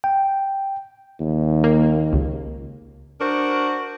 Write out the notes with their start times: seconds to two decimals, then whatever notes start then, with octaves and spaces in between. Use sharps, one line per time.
0.04 G5
1.20 D#2
1.64 A#3
2.13 C#2
3.21 D4 F#4 A#4 C5